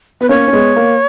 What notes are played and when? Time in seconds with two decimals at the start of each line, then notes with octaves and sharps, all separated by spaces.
0.21 B3 B4
0.29 A#3 C#4 C#5
0.48 C#4
0.53 G#3 B3
0.76 A#3